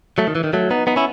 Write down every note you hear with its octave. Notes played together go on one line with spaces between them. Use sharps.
F#3 A3
D#3
E3
D#3
F#3 A3
B3 D#4
B3 D#4
C#4 E4